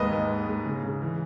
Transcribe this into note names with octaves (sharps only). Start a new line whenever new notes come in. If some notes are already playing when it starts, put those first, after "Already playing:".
Already playing: D#2 G#2 B4 D#5
D#2
G#2
G#2
C#3
C#3
E3